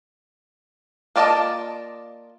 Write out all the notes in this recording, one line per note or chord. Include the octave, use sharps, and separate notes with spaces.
A#3 F4 D5 D#5 A5